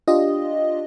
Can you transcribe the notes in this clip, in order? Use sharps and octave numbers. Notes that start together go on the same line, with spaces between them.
D4 F4 G4 D#5